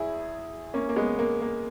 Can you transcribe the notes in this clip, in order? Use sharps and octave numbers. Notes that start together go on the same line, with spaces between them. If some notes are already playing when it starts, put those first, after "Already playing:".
Already playing: E2 E4 G#4
A#3 C#4
A#3
G#3 B3
A#3
A#3